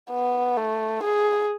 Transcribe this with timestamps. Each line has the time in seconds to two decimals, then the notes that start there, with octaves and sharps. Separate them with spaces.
0.11 B3
0.57 A3
1.03 G#4